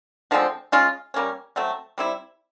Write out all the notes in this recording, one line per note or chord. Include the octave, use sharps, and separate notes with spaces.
D3 F3 G#3 C4
G#3 C#4 F4
G3 A#3 C#4
F#3 A3 C4
G3 C4 E4